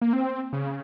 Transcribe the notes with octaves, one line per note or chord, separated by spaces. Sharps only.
A#3
C4
C#3